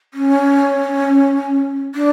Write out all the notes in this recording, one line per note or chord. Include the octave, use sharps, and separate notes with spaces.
C#4
D4